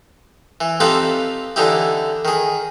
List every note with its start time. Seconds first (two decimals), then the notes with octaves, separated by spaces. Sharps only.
0.61 E3
0.80 C4 D#4 F4 G4 A4 B4
1.56 D3 E3 D#4 E4 G4
2.25 D#3 G#4